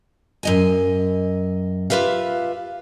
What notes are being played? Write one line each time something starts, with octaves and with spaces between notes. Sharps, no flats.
F#2 D#5 G#5
F4 G4 B4 E5 F5